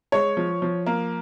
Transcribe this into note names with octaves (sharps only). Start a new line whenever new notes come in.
G#3 C#5
F3
F3
A#3